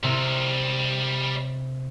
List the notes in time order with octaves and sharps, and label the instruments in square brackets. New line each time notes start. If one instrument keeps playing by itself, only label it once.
[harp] C3 [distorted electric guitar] G3 A#4